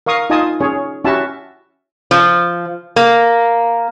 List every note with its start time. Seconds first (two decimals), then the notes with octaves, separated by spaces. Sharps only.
0.06 A#4 F5 C#6 D#6
0.30 D#4 F4 D#5 G#5 A5 D#6
0.60 C#4 G#4 C#5
1.04 C#4 E4 F#4 G4 E5 A5
2.11 F3
2.96 A#3